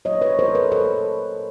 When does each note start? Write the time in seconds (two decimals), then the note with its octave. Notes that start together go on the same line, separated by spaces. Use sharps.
0.05 A#2 F#3 A#3 C#5 D#5
0.21 B4 C#5
0.39 A#4 C5
0.55 A4 B4
0.72 A#2 F#3 A#3 A4 B4